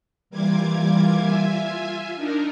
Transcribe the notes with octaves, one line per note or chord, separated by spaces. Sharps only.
E3 G3 A#3 F4 D6 G#6
F4 E5 G#5
D4 D#4 A#4